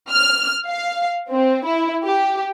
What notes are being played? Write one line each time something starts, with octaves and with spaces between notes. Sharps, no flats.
F6
F5
C4
E4
G4